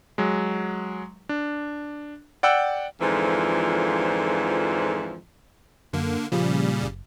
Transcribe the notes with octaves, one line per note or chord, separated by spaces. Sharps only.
F#3 G#3
D4
D5 F#5 G5 E6
F2 G#2 D3 E3 F3
F#2 D3 A#3
A#2 C#3 F3 G3
F#1